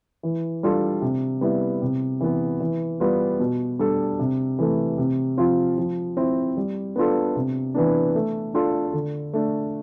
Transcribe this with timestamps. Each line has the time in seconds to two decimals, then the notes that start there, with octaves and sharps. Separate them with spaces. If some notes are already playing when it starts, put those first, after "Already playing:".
0.23 E3
0.63 G3 D4 F4 A4
1.02 C3
1.41 G3 B3 E4
1.82 C3
2.20 E3 B3
2.60 E3
3.00 G3 B3 F4
3.40 B2
3.79 G3 D4 A4
4.19 C3
4.59 E3 A3
4.98 C3
5.37 F3 C4 F4
5.78 F3
6.17 C4 E4
6.57 G3
6.96 B3 D4 F4 A4
7.36 C3
7.74 E3 B3 D4
8.15 A3
8.54 D4 F4 A4
8.93 D3
9.33 A3 D4